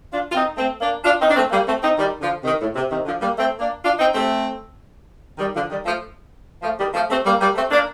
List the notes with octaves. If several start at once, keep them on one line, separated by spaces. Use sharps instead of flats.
D4 F4
F4
C4 D#4
A3 C4
A#3 D4
D4 F4
C4 D#4
D4
A3 C4
G3 A#3
A3 C4
C4 D#4
D#3 G3
D3 F3
C3 D#3
A2
C3
C3 D#3
D3 F3
G3 A#3
A3 C4
A#3 D4
D4 F4
C4 D#4
A3 C4
D#3 G3
D3 F3
D#3 G3
F3 A3
F3 A3
D#3 G3
F3 A3
A3 C4
G3 A#3
G3 A#3
A3 C4
A#3 D4